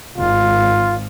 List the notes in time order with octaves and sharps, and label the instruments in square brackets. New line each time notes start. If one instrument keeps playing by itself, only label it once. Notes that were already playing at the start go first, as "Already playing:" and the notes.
[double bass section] G#1 [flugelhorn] F4